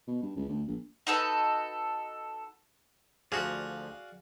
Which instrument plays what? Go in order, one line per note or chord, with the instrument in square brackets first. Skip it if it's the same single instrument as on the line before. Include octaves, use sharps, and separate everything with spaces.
[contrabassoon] B2
G2
C#2
D2
A#1
[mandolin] D#4 F#4 A4 B4
[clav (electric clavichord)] D2 F3 [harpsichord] F#4 G#4 [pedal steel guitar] D5 F5